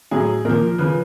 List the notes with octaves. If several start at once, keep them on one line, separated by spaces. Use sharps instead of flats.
A2 F#3 G#4
A#2 F3 A#4
C#3 F3 B4